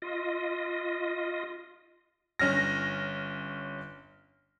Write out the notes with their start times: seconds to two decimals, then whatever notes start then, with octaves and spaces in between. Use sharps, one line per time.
0.02 F4 D#5
2.39 G1 C#4 F6 A#6